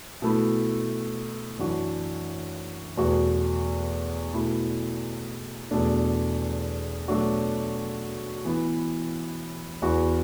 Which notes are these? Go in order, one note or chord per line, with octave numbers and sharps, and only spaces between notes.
B2 A3 E4
F#2 E3 D4 F#4
E2 B2 A3 F#4
B2 A3 E4
E2 B2 A3 D4
B2 F#3 A3 D4 F#4
E3 B3 E4
E2 E3 B3 F#4